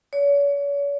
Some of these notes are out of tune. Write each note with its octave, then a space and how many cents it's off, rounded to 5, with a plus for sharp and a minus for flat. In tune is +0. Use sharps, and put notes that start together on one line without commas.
C#5 +40